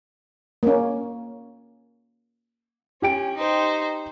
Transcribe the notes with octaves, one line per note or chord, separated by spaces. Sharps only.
A#3 C#4
C#4 G4 G5 D7
D#4 C5